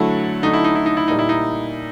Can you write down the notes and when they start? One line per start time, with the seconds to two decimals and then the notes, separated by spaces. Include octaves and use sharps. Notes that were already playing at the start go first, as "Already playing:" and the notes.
Already playing: D3 F#3 A3 E4
0.43 D3 F#3 A3 D#4
0.53 E4
0.64 D#4
0.75 E4
0.86 D#4
0.97 E4
1.08 A#2 G3 D#4
1.19 E4
1.29 D#4